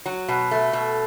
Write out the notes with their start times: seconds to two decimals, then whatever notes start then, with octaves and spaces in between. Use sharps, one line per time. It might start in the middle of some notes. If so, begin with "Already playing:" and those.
0.06 F#3
0.29 B2
0.51 A3
0.73 B2